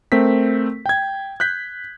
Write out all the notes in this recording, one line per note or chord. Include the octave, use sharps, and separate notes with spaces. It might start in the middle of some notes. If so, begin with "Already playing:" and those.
A3 C4 A#4 B6
G5 G#6
F#6 G6 B6